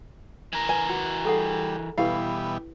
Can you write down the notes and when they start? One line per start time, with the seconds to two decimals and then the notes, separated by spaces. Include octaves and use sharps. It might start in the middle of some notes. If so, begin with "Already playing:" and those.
0.53 E3 A#4
0.69 B4 G#5
0.89 F#4
1.25 G3 G#4 A4 F#5
1.98 B2 E3 G3 E4 G4 B4 F5